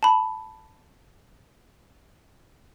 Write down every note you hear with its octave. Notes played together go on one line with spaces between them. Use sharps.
A5 B5